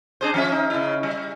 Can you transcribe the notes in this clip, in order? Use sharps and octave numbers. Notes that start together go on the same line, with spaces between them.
D4 G#4 C5
F3 C#4 E5
D#4
C#3 E4
G3